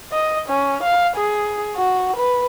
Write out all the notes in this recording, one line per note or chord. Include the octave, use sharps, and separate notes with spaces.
D#5
C#4
F5
G#4
F#4
B4